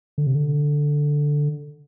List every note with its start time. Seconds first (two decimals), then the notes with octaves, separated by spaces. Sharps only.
0.18 D3
0.27 C3
0.35 D3